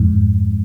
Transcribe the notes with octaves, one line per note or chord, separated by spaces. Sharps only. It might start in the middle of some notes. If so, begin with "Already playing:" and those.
Already playing: F2 G#2